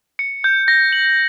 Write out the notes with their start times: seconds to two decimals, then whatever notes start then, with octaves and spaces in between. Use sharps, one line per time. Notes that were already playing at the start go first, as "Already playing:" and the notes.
0.19 C#7
0.44 G6
0.68 A#6
0.93 F#7